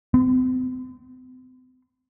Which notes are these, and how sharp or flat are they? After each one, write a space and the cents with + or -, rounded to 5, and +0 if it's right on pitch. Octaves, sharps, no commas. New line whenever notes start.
C4 -45